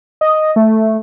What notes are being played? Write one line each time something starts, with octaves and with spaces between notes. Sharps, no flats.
D#5
A3